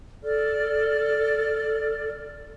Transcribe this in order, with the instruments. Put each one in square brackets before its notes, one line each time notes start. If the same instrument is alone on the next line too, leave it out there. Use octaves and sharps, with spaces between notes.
[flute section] A4 D5 F6